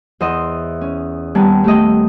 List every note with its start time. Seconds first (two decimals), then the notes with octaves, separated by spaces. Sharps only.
0.20 E2 C5 D#5
0.81 C#4
1.35 D#2 G3 B3 G#5 A5
1.64 A3 G4 D#5